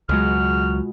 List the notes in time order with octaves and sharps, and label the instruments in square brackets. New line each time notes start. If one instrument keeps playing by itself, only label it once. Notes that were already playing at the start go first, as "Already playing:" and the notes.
[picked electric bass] C#2 F#3 [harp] B2 G#3 F4 [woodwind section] F#4 F6